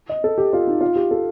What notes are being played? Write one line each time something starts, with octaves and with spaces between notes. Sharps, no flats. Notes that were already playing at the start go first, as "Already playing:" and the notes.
D#5
A4
G4
F4
D#4
F4
G4
A4